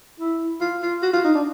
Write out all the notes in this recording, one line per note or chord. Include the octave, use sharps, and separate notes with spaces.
E4
F4
F4
F#4
F4
D#4
D4